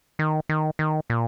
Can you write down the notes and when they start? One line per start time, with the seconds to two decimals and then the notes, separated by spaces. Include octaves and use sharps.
0.19 D#3
0.49 D#3
0.79 D#3
1.10 A#2